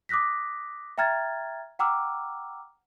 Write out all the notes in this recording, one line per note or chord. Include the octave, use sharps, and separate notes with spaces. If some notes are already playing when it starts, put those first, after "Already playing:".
D6 D#6 F#6 A#6 B6
E5 G5 A#5 F6 G#6 A6
F#5 G5 A#5 D6 E6 F6